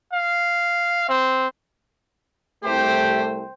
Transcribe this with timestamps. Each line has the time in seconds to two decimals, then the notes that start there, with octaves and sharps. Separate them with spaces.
0.13 F5
1.09 C4
2.64 C2 A3 G4 C5 G5